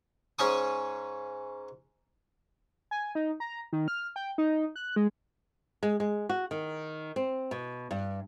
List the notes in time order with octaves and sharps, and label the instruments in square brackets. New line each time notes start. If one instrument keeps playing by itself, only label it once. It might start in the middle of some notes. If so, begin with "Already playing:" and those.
[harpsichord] G#2 C#4 C#5 G#5 C#6 D#6
[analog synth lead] G#5
D#4
A#5
D#3
F6
G5
D#4
F#6
G#3
[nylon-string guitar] G#3
G#3
F#4
D#3
C4
B2
G2